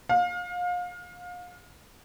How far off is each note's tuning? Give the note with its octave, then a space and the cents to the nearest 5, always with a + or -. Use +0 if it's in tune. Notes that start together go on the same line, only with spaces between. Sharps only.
F5 +30